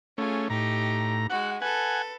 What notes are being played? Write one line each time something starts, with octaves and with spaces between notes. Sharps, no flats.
A3 C#4 F4 G#4
A2 D#4 G4 A#5
G#3 F#4 F#5
A4 B4 F#5 G#5